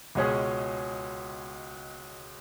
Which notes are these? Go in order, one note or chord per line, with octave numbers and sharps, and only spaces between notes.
C#2 B2 G#3 C#4 G#4